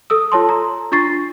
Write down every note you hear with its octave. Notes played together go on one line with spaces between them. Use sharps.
A4 D#6 E6
F4 C#5 A5 C6
A#5
D4 F4 C#6 A6 C7